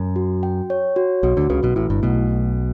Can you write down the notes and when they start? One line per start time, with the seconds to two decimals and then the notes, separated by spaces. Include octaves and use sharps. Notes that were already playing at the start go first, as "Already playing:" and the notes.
Already playing: F#2
0.16 F#4
0.43 G5
0.70 C#5
0.96 F#4
1.23 B1 B2 F#4
1.37 D2 D3
1.50 C#2 C#3 B4
1.63 B1 B2
1.76 A1 A2 E4
1.90 G1 G2
2.03 B1 B2 A3